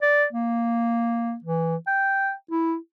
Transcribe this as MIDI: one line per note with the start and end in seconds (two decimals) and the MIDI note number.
0.02 0.25 74
0.33 1.36 58
1.44 1.76 52
1.87 2.32 79
2.51 2.76 64